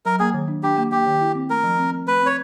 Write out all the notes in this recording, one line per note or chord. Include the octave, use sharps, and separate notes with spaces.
F#3 A#4
A#3 G#4
D#3
D4
D4 G4
A#3
A#3 G4
D#3
E4
C4
A3 A#4
F3
C4
C4
A3 B4
C4 C#5